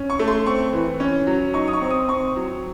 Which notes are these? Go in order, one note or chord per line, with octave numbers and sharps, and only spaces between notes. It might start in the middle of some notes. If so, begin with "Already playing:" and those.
Already playing: C#4
C#6
A3
C6
C4 C#6
E3
C#4
F#3
D#4 C#6
D#6
C#6
C4
D#6
C4 C#6
F#3